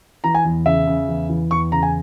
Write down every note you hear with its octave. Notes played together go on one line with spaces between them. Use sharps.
E3 A#5
G#5
E2
C#3 E5
C#3
E2
E3
E2 C#6
C#3 A#5
G#5